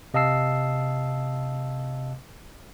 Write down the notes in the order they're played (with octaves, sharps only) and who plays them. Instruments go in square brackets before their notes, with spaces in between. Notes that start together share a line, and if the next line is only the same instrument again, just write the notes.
[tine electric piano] C3 D#5 F5 A5 E6 C7